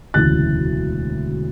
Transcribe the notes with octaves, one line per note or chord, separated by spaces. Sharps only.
E1 D2 C#3 E3 F#6 A6